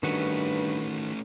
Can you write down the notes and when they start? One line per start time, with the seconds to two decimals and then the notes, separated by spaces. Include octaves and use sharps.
0.03 G2 D#3 A3 C#4 F#4 B4